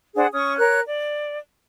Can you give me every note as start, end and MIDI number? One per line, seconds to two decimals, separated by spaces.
0.16 0.26 62
0.16 0.26 68
0.16 0.26 72
0.16 0.26 78
0.33 0.57 61
0.33 0.57 85
0.33 0.57 87
0.58 0.81 70
0.58 0.81 73
0.58 0.81 90
0.86 1.39 74